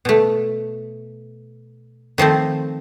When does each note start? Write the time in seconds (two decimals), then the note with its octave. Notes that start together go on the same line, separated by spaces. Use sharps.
0.05 B2 A3
2.18 D#3 F3 A3 C4